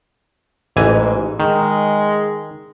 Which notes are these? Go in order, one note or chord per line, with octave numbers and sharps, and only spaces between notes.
A1 G#2 E3 G#5
D#3 G#3